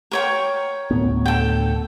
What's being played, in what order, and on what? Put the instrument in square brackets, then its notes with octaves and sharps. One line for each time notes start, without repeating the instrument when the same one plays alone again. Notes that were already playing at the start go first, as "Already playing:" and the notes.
[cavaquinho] A#4 C#5 G5
[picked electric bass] D2 A2 B3
[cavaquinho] A4 G5